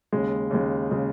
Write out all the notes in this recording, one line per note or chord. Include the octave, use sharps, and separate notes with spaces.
D#2 C#3 G#3
D#2 C#3 G#3
C#3 G#3